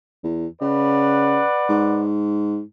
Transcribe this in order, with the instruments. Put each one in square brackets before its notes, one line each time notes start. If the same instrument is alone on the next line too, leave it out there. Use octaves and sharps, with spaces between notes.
[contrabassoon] E2
[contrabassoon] C#3 [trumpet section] B4 D5 F#5
[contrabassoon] G#2